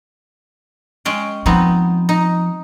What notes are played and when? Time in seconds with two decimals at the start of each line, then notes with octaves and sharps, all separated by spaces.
1.05 G#3 C#4 G5
1.46 F3 B3 C4 D#4
2.09 D#4